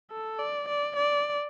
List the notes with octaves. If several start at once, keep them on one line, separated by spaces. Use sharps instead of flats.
A4
D5
D5
D5